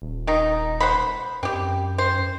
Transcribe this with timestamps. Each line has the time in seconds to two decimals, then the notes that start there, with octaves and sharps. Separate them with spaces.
0.02 D#1
0.27 D#3 D#4
0.80 C5 F#5 B5
1.43 F#2 C4 G4
1.98 C5